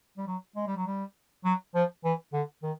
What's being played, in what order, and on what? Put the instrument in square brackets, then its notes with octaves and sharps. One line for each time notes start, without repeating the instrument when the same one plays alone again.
[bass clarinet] G3
F#3
G#3
G3
F#3
G3
F#3
F3
E3
D3
D#3